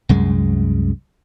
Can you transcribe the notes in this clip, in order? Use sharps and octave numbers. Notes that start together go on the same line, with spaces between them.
C2 F#2 G#3